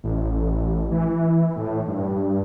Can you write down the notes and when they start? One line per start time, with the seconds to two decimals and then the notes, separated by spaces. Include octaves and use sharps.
0.04 A1
0.91 E3
1.56 A2
1.88 G2